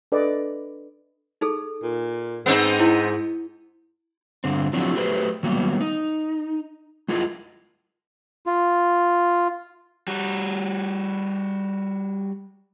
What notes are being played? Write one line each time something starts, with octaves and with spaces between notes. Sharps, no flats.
D4 A4 B4 D5 D#5
D#4 G#4 A4
A#2
G#2 B3 C4 D#4 F#5
E4
G2 D3 C4
F3 F#3 C4 D4 E4 F#4
F#3 A3 G4 B4 C5
D#3 F#3 G3 A#3 B3
D#4
G#3 E4 F4 A#4 D#5
F4
G3 F#4